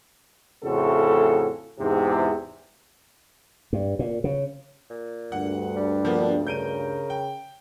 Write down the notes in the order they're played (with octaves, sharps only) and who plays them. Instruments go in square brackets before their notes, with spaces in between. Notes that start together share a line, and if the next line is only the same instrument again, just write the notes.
[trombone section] F2 A2 C#3 A3 F#4 A4
E2 G#2 C3
[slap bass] G2
A#2
C#3
[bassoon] A#2
[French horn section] D2 G2 [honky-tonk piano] F#5
[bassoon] G3 [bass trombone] D4
[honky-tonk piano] F3 A#3 B3
[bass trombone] C#3 [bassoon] A#4 [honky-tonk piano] G6 D7 D#7
[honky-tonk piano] G5